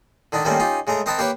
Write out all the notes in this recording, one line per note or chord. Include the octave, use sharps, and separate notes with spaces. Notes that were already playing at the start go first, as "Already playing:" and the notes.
D3 D#3 D4 D#4
D#3 G3 A3 A#3 C4 C#4
C#4 D#4 F4 G4
C#3 G#3 A3 A#5
C4 A#4 D#5 F#5 A5 B5
A#3 G4 A#4 B4 C#5 G5